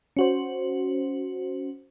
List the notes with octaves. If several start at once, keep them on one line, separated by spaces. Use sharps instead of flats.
C#4 F#4 C5